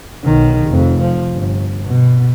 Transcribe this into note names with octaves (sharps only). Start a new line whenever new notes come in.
B1 D#3
F1 F2
F3
G1
B2